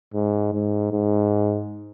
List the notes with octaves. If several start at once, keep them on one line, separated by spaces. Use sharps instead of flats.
G#2
G#2
G#2